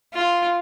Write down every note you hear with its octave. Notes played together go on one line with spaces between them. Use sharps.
F4